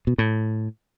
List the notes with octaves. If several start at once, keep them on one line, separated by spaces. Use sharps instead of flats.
B2
A2